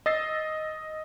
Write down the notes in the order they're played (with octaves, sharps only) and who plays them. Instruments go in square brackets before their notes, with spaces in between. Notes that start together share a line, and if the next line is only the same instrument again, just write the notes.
[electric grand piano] D#5 E6 A6 C7